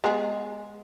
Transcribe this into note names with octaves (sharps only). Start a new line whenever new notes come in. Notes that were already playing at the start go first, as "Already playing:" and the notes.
G#3 B3 G#4